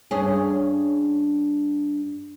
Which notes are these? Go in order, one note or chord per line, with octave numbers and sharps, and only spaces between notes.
G2 C#4 G#4